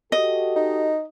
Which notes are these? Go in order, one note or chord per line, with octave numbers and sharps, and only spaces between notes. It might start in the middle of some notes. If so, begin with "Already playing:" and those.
F#4 G4 A4 D#5
D#4